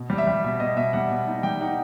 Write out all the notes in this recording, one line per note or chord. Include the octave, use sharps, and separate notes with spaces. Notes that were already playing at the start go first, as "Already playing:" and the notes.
Already playing: B2
G3
E5
G3
B2 E5
B2 D#5
B2 E5
G3 F#5
B2
D#4
G3 G5
D#4 F#5